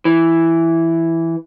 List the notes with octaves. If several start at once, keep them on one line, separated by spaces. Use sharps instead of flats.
E3